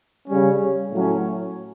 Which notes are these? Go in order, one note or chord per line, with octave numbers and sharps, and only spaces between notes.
C#3 G3 C#4
A2 F#3 C#4